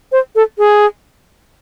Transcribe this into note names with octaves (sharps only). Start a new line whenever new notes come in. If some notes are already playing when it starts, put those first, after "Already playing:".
C5
A4
G#4